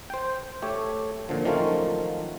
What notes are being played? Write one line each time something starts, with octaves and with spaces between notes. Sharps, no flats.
C5 G5
A3 G4 A4 C#5
A#2 D3 F3
D#3 F3 F#3 A3 C#4 F4